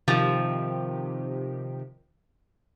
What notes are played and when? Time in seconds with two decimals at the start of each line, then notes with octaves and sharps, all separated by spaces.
0.08 C3 D#3 F3 G4